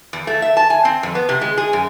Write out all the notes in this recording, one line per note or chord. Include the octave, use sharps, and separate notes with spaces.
E2
A3
E5
A5
G#5
C4
F2
B3
C3
G#3
G#4
F#2